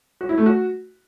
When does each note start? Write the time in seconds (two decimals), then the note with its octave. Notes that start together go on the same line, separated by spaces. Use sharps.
0.21 F#4
0.29 E4
0.38 A3
0.46 F#4